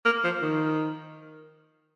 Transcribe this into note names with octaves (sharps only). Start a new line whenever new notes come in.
A#3
F3
D#3